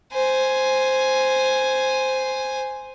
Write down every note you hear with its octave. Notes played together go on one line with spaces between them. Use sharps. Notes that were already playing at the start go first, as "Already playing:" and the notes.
C5 G#5